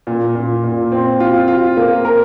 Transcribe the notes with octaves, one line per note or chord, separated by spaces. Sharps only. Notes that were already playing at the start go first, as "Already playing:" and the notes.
A#2
A#2
A#2
C4
F4
F4
A#3
A#4